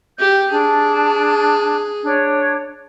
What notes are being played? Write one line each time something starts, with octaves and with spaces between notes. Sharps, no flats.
G4 G6
D4 G#4 A5
D4 C#5